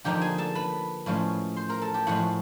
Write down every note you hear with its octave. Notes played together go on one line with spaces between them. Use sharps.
D3 F3 A#3 D#4 G4 G5
G#4 G#5
A4 A5
B4 B5
A2 F3 G#3 C#4
C5 C6
A#4 A#5
A4 A5
G4 G5
A2 F3 G#3 F#4 F#5